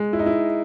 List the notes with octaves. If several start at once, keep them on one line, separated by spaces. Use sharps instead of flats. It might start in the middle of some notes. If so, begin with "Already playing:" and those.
Already playing: G#3
E4
D#4
E4